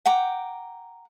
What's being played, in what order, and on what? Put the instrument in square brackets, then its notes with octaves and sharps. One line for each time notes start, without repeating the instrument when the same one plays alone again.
[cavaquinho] F#5 G5 A#5 D6